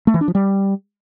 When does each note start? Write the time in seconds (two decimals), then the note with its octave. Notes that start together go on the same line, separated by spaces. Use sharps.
0.07 A3
0.14 E3
0.21 D4
0.28 F3
0.35 G3